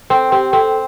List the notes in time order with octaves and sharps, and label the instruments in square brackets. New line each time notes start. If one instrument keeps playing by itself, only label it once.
[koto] C4 [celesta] A4
[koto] C4 [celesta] G4
[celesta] C5
[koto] C4 [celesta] A4